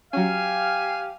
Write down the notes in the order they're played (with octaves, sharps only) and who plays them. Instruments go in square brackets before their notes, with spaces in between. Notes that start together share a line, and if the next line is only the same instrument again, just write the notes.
[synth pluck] F#3 C#4 [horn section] G4 F5 [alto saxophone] G#5